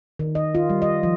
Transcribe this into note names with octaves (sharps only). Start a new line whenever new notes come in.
D#3
D#5
F4
G3
D#5
F3